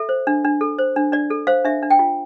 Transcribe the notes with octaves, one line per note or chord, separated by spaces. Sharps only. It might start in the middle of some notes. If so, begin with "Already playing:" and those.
Already playing: A4 E5
C5
D4
D4
A4
C5
D4
D4 D5
A4
C5 F5
D4 E5
D4
G5
F4